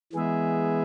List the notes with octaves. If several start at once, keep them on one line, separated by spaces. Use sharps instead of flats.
E3 G#3 B3 G#4 E5